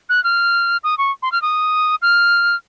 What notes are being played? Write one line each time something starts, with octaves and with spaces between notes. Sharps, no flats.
F#6
F6
D#6
C#6
C6
F6
D#6
F6